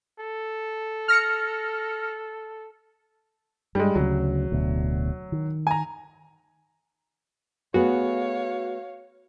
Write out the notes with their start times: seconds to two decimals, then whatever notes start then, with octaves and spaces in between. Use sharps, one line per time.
0.20 A4
1.08 F6 A#6 C#7
3.75 G2 G3 G#3
3.95 D2 C#3 F#3
4.51 D1 D2 B2
5.32 D#3
5.67 G#5 A#5
7.74 A3 B3 F#4 G#4 C#5 F5